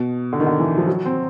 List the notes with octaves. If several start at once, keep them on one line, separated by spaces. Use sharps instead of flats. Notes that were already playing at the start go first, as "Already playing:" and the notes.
Already playing: B2
D3
D#3
D3
E3
F3
F#3
C4